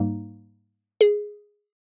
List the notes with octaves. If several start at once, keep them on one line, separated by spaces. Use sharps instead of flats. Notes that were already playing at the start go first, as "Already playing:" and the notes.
Already playing: G#2 G3 A#3 D#4
G#4